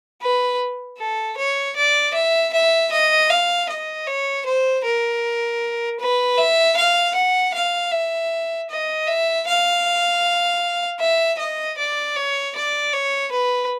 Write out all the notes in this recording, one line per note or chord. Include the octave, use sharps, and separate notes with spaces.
B4
A4
C#5
D5
E5
E5
D#5
F5
D#5
C#5
C5
A#4
B4
E5
F5
F#5
F5
E5
D#5
E5
F5
E5
D#5
D5
C#5
D5
C#5
B4